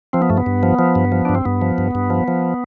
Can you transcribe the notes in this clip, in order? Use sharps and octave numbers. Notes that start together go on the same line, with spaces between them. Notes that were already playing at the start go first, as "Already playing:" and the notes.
F3 C4
B3
G2 A3
B3
G2
F3
F3
G2
F3
G2 D4
C4
G2 B3
F3
G2
G2
F3
F3